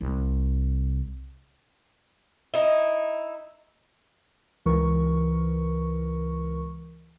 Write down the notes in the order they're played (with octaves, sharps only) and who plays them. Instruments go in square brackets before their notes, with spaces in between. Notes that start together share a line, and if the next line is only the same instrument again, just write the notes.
[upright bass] C2
[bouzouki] D#4 E4
[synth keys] C#2 E3 A#4 C#6